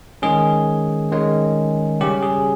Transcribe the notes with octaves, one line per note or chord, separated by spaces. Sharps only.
D#3 G#3 C#4 G#4
D#3 G#3 C#4
C#3 G3 C#4 G4
G#4